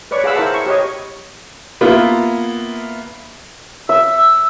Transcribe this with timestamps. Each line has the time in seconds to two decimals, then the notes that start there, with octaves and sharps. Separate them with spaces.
0.11 B4 C#5 D5 C#6
0.24 G#4 F5 F#5 B5 E6
0.36 E4 A#4 C5 E5 A5
0.54 C#6
0.66 G4 C#5 D#5
1.81 A#3 B3 E4 F4
3.89 E5 E6